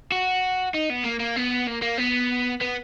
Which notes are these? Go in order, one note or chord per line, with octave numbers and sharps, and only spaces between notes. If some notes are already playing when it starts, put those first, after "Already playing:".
F#4
D#4
B3
A#3
A#3
B3
A#3
A#3
B3
B3